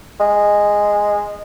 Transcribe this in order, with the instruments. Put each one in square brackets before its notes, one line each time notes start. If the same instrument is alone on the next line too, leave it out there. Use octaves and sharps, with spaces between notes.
[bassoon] G#3